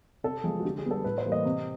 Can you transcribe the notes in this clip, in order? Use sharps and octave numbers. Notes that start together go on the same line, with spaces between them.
C3 A4
F3 G#3 B3 G#4
F#4
D3 G4
G#4
G3 B3
A4
A2 B4
C5
E3 G3 A#3
D#5
C3